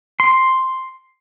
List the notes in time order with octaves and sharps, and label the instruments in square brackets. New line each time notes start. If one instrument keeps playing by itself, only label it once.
[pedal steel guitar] C6